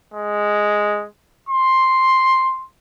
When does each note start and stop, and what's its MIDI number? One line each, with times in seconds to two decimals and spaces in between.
0.14 1.06 56
1.49 2.64 84